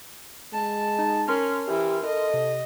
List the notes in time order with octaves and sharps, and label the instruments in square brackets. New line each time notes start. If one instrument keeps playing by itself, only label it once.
[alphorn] G#3 [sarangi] A5
[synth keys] D#4
[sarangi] C#4 [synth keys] A#4 C6 F6
[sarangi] E3 [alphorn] G4
[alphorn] A4 [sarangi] D#5
[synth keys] C3